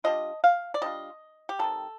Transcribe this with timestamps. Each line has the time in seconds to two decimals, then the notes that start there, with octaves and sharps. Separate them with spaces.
0.04 G3 D4 F4 D#5
0.44 F5
0.74 D5
0.82 G3 D4 F4 D#5
1.49 G4
1.59 C3 D#3 G3 A4